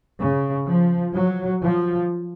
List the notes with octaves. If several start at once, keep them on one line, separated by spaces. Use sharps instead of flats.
C#3
F3
F#3
F3